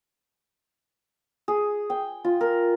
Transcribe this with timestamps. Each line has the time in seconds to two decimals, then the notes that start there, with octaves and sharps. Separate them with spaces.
1.48 G#4
1.90 G5
2.24 F4
2.41 A#4